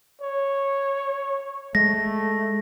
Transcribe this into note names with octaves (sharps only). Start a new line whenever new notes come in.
C#5
G#3 A3 A#6